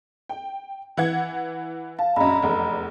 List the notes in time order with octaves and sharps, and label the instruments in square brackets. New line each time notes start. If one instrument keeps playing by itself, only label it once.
[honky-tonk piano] G5
E3 F#5 G#6
[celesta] F5 [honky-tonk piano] A5
[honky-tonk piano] A#1 F#2 [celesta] D#5 A#5 B5
[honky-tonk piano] F1 E2